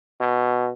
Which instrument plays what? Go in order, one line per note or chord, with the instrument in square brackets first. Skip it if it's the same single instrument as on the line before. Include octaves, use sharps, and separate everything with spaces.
[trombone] B2